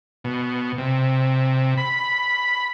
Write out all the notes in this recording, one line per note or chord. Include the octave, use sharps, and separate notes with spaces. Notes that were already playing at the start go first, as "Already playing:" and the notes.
B2
C3
B5